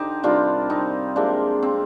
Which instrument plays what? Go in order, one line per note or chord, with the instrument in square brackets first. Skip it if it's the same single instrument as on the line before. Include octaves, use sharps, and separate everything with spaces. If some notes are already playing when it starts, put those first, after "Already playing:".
Already playing: [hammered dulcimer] D3 D#4 G4 C5 D#5
C3 D#3 G3 D4 F4
C4 D#4
C3 F3 G#3 A#3 D4
C4